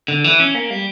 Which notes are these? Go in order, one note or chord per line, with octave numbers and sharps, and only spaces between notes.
D3
E3
C#4
A#3
G3